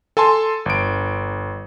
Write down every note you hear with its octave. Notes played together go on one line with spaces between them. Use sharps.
A4 G#5 A5 C6
G1 D7